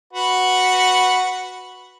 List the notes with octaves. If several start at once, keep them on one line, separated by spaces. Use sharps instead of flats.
F#4 B4